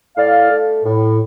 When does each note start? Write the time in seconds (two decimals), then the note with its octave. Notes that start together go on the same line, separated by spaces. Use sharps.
0.16 A2 D5 F5
0.50 A3
0.84 A2